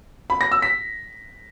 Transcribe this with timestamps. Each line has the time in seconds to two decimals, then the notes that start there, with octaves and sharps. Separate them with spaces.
0.30 B5
0.41 A#6
0.52 E6
0.62 B6